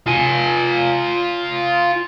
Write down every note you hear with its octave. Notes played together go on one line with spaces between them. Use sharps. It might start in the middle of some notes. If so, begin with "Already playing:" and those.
F4 G#5